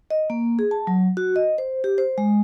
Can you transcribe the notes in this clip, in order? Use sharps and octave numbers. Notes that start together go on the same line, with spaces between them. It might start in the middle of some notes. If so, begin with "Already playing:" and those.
D#5
A#3
G#4
A5
F#3
F#4
D#5
C5
G4
C5
G#3